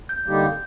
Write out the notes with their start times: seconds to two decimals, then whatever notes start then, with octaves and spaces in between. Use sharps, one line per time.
0.09 G6
0.27 D3 G3 A#3 D#4 G4